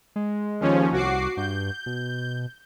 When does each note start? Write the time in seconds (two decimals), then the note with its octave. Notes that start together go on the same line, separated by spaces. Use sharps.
0.16 G#3
0.60 D#2 F3 C#4
0.92 C2 F#4 D6 C7
1.37 G2 G6
1.86 B2